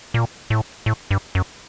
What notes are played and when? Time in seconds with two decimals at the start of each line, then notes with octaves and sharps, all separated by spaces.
0.14 A#2
0.50 A2
0.86 A2
1.11 G2
1.35 F#2